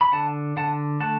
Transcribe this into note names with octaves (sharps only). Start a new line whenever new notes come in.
B5
D3 F#5 A5
D3 F#5 A5
A3 F#5 A5